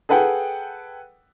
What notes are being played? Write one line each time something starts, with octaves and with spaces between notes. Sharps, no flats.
G#4 A4 B4 F#5 G5